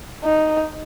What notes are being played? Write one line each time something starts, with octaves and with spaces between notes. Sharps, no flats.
D#4